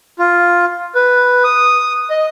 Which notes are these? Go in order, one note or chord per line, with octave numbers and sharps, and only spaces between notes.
F4
B4
D#6
D#5